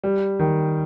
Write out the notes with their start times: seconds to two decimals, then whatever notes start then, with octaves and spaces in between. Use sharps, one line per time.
0.04 G3
0.39 D#3